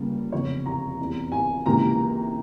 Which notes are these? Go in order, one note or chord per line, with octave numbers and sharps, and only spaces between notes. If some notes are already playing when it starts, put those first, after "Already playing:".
Already playing: C#2 C#3 G3 A#3
F1 E2 C#3 F3 C#5
A#5
F1 E2 E3
G#5
C#2 C3 E3 A#3 A#5